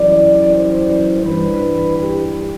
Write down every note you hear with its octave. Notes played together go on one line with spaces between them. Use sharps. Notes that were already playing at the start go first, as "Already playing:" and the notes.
Already playing: F#2 E3 G3 D5
C5
G2 E3 G3 B4
G4